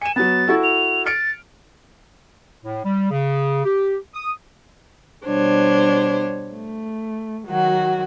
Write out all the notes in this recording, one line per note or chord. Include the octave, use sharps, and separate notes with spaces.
G#5 C#7 E7
F#3 B3 A6
E4 F#4 A4
F7
F6 A6 C#7 D7
A2
G3
C#3
G4
D#6
B2 G3 D4 C5 C#5
A3
D#3 F#3 F#4